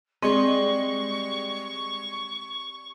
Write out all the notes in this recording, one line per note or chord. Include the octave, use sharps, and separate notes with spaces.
G3 G#3 C4 C#6